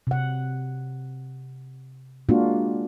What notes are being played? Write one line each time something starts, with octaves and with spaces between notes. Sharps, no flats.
C3 F#5
G#3 A#3 D4 F4 F#4